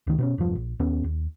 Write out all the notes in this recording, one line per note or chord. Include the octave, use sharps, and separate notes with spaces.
C#2 D#3
B2 C4 C#4
E1 G2 F3
A#1
D#2 B3 C#4
D#2